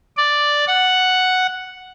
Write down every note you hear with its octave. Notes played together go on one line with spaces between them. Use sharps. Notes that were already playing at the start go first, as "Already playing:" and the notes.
D5
F#5